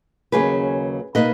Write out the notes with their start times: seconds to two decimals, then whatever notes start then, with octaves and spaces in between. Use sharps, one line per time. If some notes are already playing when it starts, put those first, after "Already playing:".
0.32 D#2 C#3 F#3 A#3 C#4 G#4 B4
1.15 B2 A#3 D#4 B4 D#5